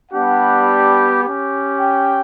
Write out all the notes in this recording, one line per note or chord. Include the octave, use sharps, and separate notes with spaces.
G3 B3 D4 G4 F#5
C#4 G4
G5